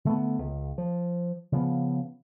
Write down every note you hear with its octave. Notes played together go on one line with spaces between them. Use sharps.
D3 A3 B3
C#2
F3
C#3 F3 B3